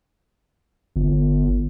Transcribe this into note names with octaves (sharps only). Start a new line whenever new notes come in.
G1